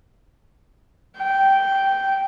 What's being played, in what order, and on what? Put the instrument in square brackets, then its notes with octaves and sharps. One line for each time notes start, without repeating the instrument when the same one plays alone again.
[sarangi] G5